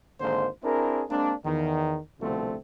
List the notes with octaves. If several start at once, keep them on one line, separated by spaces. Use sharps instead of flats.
G#1 D3 G#3 A#3 C5
C4 D4 E4 G#4 A#4
G#3 A#3 C4 D4
E2 D#3
C2 B2 D3 F3 A3 C4